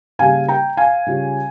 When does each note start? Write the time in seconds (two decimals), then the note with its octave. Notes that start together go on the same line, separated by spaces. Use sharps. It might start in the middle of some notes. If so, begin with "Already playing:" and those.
0.19 C#3 G3 A#3 F5 G#5
0.48 G5 A#5
0.77 F5 G#5
1.06 C#3 G3 C#4 F4